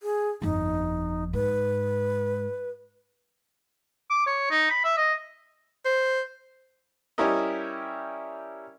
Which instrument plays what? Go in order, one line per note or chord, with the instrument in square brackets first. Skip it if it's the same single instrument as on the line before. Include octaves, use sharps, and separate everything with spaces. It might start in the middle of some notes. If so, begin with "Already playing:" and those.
[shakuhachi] G#4
[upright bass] G1 F2 [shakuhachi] D#4
[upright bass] G#2 [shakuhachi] B4
[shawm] D6
C#5
D#4
B5
E5
D#5
[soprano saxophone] C5
[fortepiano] G3 C#4 E4 G4 A#4 D#5